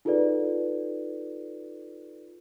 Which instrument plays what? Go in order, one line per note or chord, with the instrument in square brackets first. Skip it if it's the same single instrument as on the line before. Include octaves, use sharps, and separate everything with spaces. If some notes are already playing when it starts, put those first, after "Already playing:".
[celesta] D#4 F4 G#4 A4 B4 D5